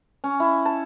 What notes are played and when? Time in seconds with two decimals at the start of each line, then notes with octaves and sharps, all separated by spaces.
0.24 C#4
0.40 E4
0.65 A5